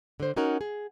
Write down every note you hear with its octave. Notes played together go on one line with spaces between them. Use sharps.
D3 C5
C#4 D#4 F#4 A#4 C#5 F#5
G#4